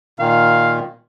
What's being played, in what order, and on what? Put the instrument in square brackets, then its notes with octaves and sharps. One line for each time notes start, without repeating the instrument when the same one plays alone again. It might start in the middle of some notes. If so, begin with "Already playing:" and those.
[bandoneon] A#2 D#3 [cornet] F5